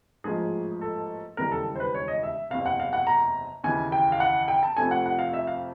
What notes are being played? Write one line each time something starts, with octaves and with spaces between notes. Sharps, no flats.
A1 G#2 F3 A#3 G#4
A4
E1 D#2 C#3 E3 G3 A#4
A4
C5
B4
C#5
D#5
E5
F#1 E2 C3 F5
F#5
F5
F#5
A#5
D#2 C#3 E3 G#5
G5
F5
F#5
G5
A5
F2 C3 F3 A3 G#5
F#5
F#5
F5
E5
F5